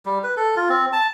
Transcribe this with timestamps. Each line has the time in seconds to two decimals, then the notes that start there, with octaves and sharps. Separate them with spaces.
0.06 G3
0.24 B4
0.37 A4
0.56 F4
0.69 C4
0.93 A5